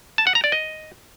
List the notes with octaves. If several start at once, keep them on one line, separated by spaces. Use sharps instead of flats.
A5
F#5
A#5
D5
D#5